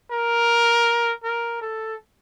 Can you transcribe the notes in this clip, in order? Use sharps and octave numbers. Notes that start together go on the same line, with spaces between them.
A#4
A#4
A4